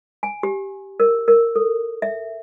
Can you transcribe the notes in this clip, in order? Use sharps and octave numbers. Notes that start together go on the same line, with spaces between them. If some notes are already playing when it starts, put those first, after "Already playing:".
G#5
G4
A#4
A#4
A4
E5